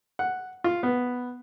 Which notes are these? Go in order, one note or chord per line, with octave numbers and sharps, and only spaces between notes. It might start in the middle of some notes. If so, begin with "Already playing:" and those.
F#5
F4
B3